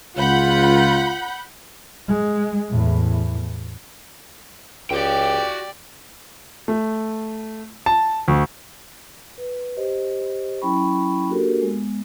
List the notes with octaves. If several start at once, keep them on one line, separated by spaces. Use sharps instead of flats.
C#2 F4 F#5 B5 G6
G#3
E2 A2
C#2 F#4 G4 D5 G5
A3
A5
D2
B4
G4 C5 D#5
F#3 C#4 E4 G5 B5 C#6
A#3 D4 F#4 G4 A4 A#4
G#3 B3